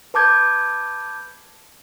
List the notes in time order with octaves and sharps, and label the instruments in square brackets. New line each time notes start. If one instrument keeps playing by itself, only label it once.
[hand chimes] B4 A5 D6 G6 G#6